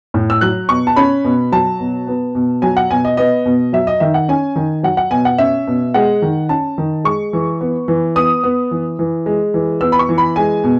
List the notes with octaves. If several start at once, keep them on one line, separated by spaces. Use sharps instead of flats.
A2
E6
F#3 F#6
B2 C#6
A5
C#4 B5
B2
F#3 A5
B2
B3
B2
F#3 G#5
F#5
B2 G#5
D#5
B3 D#5
B2
F#3 E5
D#5
D#3 E5
F#5
C#4 G#5
D#3
F#3 F#5
F#5
B2 G#5
F#5
C#4 E5
B2
G#3 F#5
D#3
C#4 A5
D#3
G#3 C#6
E3
B3
E3
B3 D#6
B3
E3
E3
G#3
E3
B3 E6
B5
C#6
E3
B5
G#3 G#5
B2